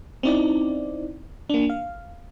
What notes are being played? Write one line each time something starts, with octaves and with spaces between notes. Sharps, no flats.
C4 C#4 D#4 E4 D5
A#3 D4
F5